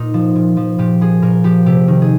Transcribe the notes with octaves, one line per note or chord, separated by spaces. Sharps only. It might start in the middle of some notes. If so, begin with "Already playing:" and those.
Already playing: A#2 D#4
F3
A#2
F3
A#2 G4
F3 G#4
A#2 A#4
F3 G4
C3 G4
D#3
G#4